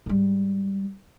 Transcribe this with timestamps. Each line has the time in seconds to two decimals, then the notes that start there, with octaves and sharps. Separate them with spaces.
0.06 G#2 G3